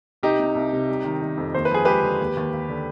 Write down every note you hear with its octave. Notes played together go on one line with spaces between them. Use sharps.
C2 D#4 G4
C3
C2
C3
G3
D#3
D#3
F2
D#2 C5
B4
F3 G#4
G#3 G4 B4
D3
D#2
D#2
D#2
D3